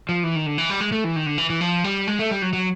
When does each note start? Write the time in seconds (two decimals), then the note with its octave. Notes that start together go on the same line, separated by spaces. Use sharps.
0.09 F3
0.23 E3
0.36 D#3
0.46 D3
0.58 E3
0.70 G3
0.80 G#3
0.92 A3
1.04 E3
1.16 D#3
1.26 D3
1.38 E3
1.50 E3
1.61 F3
1.84 G3
2.08 G#3
2.19 A3
2.31 G3
2.42 F#3
2.53 F#3